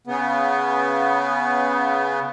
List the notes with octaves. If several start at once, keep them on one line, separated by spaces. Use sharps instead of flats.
C#3 B3